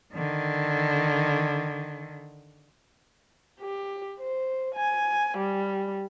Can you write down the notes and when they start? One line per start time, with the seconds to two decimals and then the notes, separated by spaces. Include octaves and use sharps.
0.14 D3 D#3
3.60 G4
4.19 C5
4.75 G#5
5.37 G3